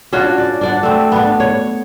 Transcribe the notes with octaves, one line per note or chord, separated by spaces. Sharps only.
C#4 D4 F4 F#4
D5
D4 D5 F#5
A3 C4
B3 D4
C#5